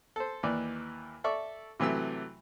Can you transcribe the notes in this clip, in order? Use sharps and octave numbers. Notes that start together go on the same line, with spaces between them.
A4 C5
D#2 E3 D5
A4 D5 E5 C#6
C3 E3 F#3 A3 E6